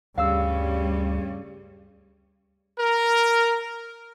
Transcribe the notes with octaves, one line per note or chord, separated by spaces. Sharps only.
D2 G2 C#3 G3 F5 E6
A#4